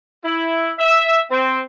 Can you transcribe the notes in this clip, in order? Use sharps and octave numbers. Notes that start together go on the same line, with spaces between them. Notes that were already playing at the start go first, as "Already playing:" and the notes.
E4
E5
C4